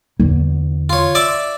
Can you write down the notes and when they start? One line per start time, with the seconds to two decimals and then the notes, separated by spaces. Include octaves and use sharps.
0.20 E2 D3
0.90 F4 C#5
1.15 D5 E5 D6